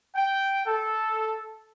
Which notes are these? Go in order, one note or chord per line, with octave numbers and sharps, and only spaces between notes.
G5
A4